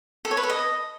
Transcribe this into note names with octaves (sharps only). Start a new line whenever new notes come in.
A4
C#5
B4
A4
D#5